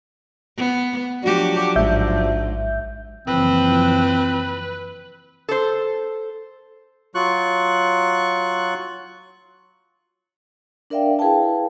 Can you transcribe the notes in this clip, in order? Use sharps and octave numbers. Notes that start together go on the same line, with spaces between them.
B3
F3 F#3 D4 F#4 G4
A1 G#2 E5 G6
F#1 E3 F3 C4 B4
A4 C5
F#3 F4 C#6 F#6
D4 A#4 D5 E5 F5 G5
E4 G#4 B4 F5 G5 A5